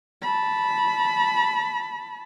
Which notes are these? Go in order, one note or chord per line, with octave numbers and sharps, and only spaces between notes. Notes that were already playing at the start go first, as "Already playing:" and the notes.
A5 B5